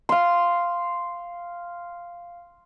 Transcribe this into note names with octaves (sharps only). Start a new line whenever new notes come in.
F5 C6